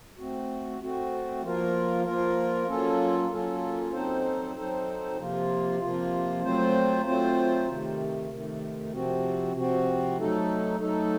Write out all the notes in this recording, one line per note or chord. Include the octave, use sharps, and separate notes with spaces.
A3 C4 F#4
A3 C4 F#4
F3 A#3 F4 A#4
F3 A#3 F4 A#4
F#3 A#3 C#4 F4 A4
F#3 A#3 C#4 F4 A4
F#3 C4 D#4 A4 C5
F#3 C4 D#4 A4 C5
C3 F3 A#3 F4
C3 F3 A#3 F4
F#3 A3 C4 F4 C5
F#3 A3 C4 F4 C5
C3 D#3 A3
C3 D#3 A3
C3 F3 C4 F#4
C3 F3 C4 F#4
F#3 A3 D#4 A4
F#3 A3 D#4 A4